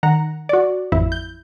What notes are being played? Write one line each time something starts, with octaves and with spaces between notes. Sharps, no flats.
D#3 F#5 A#5
F#4 D5
A1 F2 E4
G6